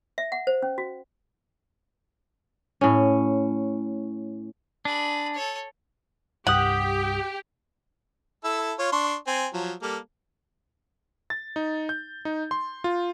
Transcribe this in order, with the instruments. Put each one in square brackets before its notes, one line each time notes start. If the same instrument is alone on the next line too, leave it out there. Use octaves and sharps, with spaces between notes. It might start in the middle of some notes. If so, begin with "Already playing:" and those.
[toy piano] E5
F#5
C5
C#4
F#4
[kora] A2 C#4
[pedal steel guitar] D4 [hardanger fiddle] G#4 B5
[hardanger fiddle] A4 C#5
[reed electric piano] C2 G2 D#6 [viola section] G4 [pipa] F#5
[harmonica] E4 A4 E6
F4 C#5
D4 C6 C#6
C4 G#5
F3 F#3
G3 A#3 A4
[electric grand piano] A6
D#4
G6
D#4
C6
F4